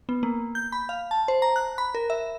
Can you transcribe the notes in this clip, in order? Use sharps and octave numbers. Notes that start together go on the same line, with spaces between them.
B3
A#3
G6
B5
F5
A5
C5
A#5
F#6
B5
A#4
E5